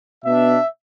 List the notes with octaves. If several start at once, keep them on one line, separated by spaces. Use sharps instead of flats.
B2 B3 D4 E5